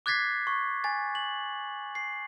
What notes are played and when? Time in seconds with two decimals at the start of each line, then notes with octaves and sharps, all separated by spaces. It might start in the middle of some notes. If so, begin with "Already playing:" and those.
0.06 D6 F#6 G#6 A6 B6 C7
0.47 C#6
0.84 G#5 A6
1.15 F#7
1.95 C7